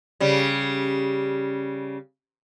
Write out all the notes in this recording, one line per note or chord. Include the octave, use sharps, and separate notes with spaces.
C#3 G3